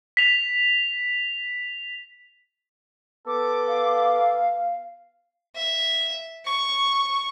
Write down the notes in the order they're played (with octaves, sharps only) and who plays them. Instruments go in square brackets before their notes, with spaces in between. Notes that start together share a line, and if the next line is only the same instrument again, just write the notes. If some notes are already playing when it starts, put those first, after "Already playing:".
[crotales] B6 F7
[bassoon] B3 [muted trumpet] A4 [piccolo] D6
[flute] F5
[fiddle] E5
C#6